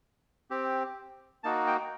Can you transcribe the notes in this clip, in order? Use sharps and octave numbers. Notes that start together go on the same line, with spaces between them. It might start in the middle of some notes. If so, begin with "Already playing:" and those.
C4 G4
A#3 D#4 F#4 A5
G5